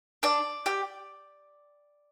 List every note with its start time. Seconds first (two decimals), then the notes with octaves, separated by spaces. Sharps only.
0.23 D4 D5
0.66 G4